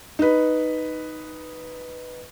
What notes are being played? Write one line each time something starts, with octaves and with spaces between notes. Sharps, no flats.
D#4 B4